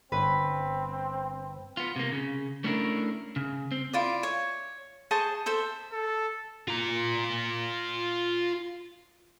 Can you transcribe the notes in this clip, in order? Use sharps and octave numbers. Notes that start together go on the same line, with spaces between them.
G1 C4 B4 C#5
B3 F4
C3 A#3
C#3
A3 C#4 D4 E4 G4 A#4
C#3
C4
E4 F4 D5
C#5
G#4 C5 A5 C#6
A4 C5 E5
A4
F4 A#5